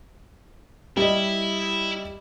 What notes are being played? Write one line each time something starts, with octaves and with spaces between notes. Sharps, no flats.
G3 E4 D#5